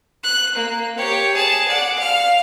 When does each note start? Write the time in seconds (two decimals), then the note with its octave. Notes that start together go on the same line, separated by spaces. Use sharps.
0.24 F#6
0.55 A#3
0.97 G4 C#5
1.34 G#4 A5
1.68 D5 F#5
1.99 F5 F6